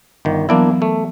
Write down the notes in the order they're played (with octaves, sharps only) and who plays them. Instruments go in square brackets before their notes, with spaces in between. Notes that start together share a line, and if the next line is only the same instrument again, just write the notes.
[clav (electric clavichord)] G1 D#3
[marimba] E3 F#3 B3 [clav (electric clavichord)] A#3 D4 E4
[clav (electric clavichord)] A3